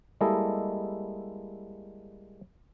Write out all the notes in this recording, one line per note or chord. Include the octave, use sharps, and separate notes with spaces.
G3 G#3 A#3 E4 A4 D#5